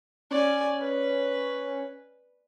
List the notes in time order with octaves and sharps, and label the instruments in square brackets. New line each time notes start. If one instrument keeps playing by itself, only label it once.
[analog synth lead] C#4 [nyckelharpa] D5 G#5
[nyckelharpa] B4